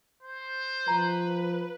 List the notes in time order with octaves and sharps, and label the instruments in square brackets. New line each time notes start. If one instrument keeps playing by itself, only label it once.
[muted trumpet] C5
[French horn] F3 [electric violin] B4 [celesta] A#5